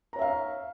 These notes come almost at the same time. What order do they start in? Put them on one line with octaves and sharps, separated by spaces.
A#5 C#5 E5 F5